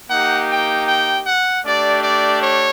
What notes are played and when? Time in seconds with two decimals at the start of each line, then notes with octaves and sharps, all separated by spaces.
0.10 A#3 D#4 G4 F#5
0.49 G5
0.87 G5
1.26 F#5
1.64 A3 D4 G4 D5
2.03 D5
2.41 C#5